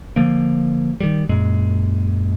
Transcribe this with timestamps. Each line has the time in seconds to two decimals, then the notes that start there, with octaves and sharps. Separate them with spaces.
0.16 D3 F3 A#3
1.00 D#3 G3
1.29 F#2 A#2 G#3